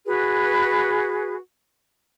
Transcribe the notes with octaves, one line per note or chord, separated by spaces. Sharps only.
F#4 G#4 B4